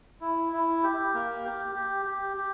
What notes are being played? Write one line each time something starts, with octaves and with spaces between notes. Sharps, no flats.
E4
E4
G4
A#3
G4
G4
G4
G4